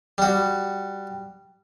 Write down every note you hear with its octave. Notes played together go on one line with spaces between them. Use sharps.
G3 F#4